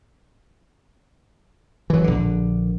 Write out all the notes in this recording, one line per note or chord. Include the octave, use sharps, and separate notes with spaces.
E3 F#3
A#1 D3